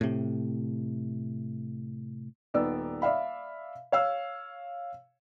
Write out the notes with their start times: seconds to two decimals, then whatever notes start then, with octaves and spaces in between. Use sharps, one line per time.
0.01 A2 C3
2.54 D#1 B3 D#4 D5 E6
3.02 D5 E5 F5 B5
3.92 C#5 F5 E6